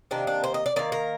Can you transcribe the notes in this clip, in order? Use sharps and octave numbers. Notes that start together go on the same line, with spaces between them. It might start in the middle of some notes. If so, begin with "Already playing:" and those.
C3 D#3 A#3 D4
D4
C5
D#5
D5
D#3 A#3 D5
A#4